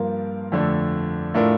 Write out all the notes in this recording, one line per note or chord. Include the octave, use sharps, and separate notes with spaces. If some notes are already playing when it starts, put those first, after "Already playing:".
Already playing: G2 F3 A#3 F4 A#4
F2 D3 A3 D4
A2 A3 D4 F4 A#4